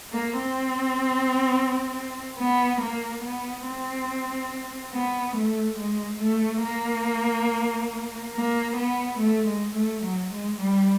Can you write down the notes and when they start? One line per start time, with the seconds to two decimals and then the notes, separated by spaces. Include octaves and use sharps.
0.12 A#3
0.41 C4
2.39 B3
2.82 A#3
3.24 B3
3.66 C4
4.94 B3
5.37 A3
5.79 G#3
6.22 A3
6.64 A#3
8.34 A#3
8.77 B3
9.19 A3
9.48 G#3
9.75 A3
10.04 F#3
10.33 G#3
10.61 G3